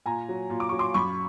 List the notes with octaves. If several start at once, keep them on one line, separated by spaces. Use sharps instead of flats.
A#2 G#5 A#5
F#3
A#2
D6
F#3 C#6
C6 D6
F#2 B5 C#6